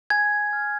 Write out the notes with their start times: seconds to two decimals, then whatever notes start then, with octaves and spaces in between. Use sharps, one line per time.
0.10 G#5 G#6
0.53 F6